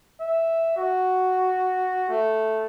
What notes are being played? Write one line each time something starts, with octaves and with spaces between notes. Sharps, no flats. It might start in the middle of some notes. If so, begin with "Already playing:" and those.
E5
F#4
A3